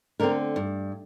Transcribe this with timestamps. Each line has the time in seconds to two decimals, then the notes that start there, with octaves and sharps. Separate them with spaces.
0.20 D3 A3 C4 A#4
0.56 G2